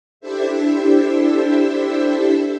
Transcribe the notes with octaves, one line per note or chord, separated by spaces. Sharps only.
D4 E4 G4 A4 C5 E5